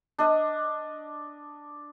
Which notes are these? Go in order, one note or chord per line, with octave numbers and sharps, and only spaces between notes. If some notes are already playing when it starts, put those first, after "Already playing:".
D4 D#5